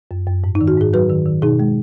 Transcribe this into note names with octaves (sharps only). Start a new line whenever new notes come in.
F#2
F#2
G#2
D#4
D#3
F#4
G#2 G#4
F#3 F#4 B4
D#3
D#3
B2 D#4 G#4
G#3